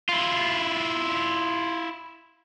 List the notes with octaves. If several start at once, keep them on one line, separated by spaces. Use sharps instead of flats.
E4 F4